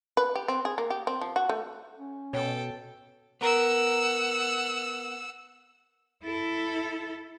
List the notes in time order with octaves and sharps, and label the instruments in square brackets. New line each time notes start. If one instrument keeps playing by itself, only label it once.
[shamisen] B4
G4
C4
G#4
A#3
G4
C4
F3
F#4
A3
[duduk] C#4
[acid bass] B2 [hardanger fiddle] A4 G5 [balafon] C#5
[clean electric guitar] B3 A#4 [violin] F#5 E6
[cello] E4 A4